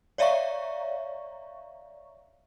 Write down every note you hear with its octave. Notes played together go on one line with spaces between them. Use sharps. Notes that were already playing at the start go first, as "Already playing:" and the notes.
C#5 D5 E5 F5 A#5 C#6